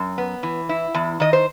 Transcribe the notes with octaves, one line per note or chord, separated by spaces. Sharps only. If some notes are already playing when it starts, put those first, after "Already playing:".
Already playing: F#2
B3
E3
E4
E2
D#3 D#5
C5